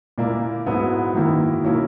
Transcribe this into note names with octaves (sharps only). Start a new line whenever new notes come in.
A#2 A#3 E4
G#2 F#3 B3 E4
F#2 D#3 A#3 E4
B2 A#3 C#4 E4